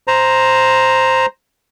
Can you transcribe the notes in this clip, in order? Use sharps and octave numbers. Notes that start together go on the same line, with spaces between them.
C5 A#5